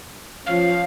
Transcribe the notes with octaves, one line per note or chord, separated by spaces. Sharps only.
F3 C#4 F5